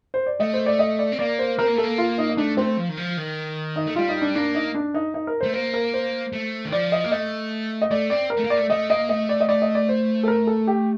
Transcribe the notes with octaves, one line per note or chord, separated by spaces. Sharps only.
C5
D5
A3 D#5
C5
D5
D#5
D5
C4
A#3 D5
C5
C4 A#4
A#3
A3 A4
A#3
F4
D#4
D#4
A3 D4
A3 C4
F3
D#3
F3
D#3
D#4
A3
G3 F4
D#4
D4
A#3 D4
D#4
D4
D#4
D#4
A#4
A3 C5
A#3 C5
A#4
C5
A3
D#3
F3 D5
D#5
A#3
A3 D#5
D#5
A3 D5
C4 D5
A#4
A3
A#3
D5
A3
A3 D#5
A#3 D#5
A3 D#5
D5
D#5
A3 D5
D#5
D5
C5
A4
A#4
A4
G4